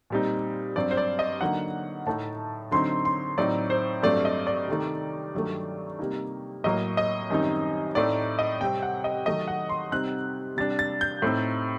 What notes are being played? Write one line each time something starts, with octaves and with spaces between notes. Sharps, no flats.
A#2 G3 C4 D#4
G2 F#3 C4 D5
C5
D5
D#5
D3 F#3 A#3 D#4 F#5
A2 A3 D#4 A5
D3 F#3 C4 D#4 C6
C6
A2 F#3 C4 D#4 D5
C5
G2 F#3 A3 C4 D5
D#5
D5
C3 D#3 A3 D#4
G2 D#3 F#3 A3
C3 G3 A#3 D#4
A2 F#3 A#3 D#5
D#5
F#2 D#3 G3 C4 D#4
A2 A3 C4 D#4 D5
D#5
C3 G3 C4 G5
F#5
D#5
D#3 F#3 A3 D#5
F#5
C6
C3 G3 C4 D#4 F#6
C3 G3 D4 A6
A6
G6
A2 A3 C4 D#4